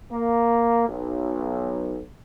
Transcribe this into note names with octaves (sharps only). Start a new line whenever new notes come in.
A#3
B1